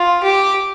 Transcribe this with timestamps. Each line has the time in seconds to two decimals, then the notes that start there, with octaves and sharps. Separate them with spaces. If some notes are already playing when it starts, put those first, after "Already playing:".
Already playing: F4
0.23 G4